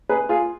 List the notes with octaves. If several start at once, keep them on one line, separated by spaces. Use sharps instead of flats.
G#4 B4
F4 G#4